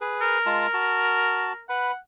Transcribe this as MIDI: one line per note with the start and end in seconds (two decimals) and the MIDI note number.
0.01 0.38 68
0.01 0.38 71
0.21 1.63 70
0.46 0.67 56
0.46 0.67 65
0.46 0.67 81
0.73 1.53 66
0.73 1.53 81
1.70 1.91 71
1.70 1.96 78
1.70 1.91 83